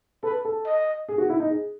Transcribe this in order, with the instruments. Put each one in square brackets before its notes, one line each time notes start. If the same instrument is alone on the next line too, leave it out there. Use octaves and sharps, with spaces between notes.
[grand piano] A4 [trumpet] B4
[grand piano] A4
[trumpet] D#5
[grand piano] G#4
F#4
E4
D#4
G#4